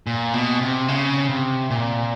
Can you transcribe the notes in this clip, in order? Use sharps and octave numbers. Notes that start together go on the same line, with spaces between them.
A#2
B2
C3
C#3
C3
A#2